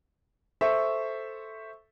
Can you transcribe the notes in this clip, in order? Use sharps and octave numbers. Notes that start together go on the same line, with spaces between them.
A4 C5 E5 C#6